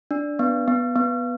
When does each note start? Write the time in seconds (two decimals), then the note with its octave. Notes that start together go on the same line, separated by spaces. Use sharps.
0.11 D4
0.39 B3
0.68 B3
0.96 B3